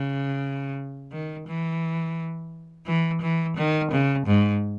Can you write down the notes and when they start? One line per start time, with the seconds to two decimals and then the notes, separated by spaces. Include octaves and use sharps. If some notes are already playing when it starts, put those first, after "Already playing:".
Already playing: C#3
1.12 D#3
1.47 E3
2.87 E3
3.22 E3
3.57 D#3
3.91 C#3
4.27 G#2